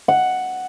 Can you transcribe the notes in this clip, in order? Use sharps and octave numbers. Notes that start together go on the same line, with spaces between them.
F#5